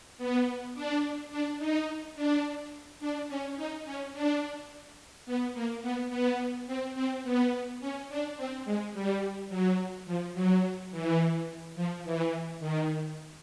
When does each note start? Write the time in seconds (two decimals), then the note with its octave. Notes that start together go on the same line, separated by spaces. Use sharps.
0.18 B3
0.74 D4
1.30 D4
1.58 D#4
2.15 D4
3.00 D4
3.28 C#4
3.56 D#4
3.85 C#4
4.13 D4
5.26 B3
5.54 A#3
5.82 B3
6.10 B3
6.66 C4
6.95 C4
7.23 B3
7.80 C#4
8.09 D4
8.36 C4
8.65 G#3
8.93 G3
9.49 F#3
10.06 F3
10.34 F#3
10.91 E3
11.76 F3
12.04 E3
12.60 D#3